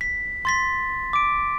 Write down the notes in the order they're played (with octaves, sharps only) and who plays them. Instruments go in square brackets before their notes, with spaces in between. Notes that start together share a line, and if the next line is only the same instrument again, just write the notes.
[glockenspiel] B6
C6 A6 B6
D6 D7